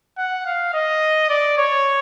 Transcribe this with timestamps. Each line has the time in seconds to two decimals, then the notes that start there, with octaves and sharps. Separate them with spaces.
0.18 F#5
0.46 F5
0.74 D#5
1.30 D5
1.58 C#5